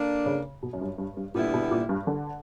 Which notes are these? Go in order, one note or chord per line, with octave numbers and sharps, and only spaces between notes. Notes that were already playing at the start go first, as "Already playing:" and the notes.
Already playing: D3 A#3 D4
C#3
B2
F#2
G2
G2
G2
A#2 D3 G3 B3 E4
B2
A#2
G2
D3